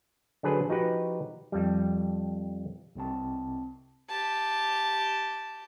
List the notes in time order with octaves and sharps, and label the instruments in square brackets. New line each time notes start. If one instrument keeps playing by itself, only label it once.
[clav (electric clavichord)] D3 F#3 D4 G#4 B4 C5
F3 D#4 F#4 G4 B4
F2 G3
[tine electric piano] C2 C3 C4 A5
[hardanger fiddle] G4 A5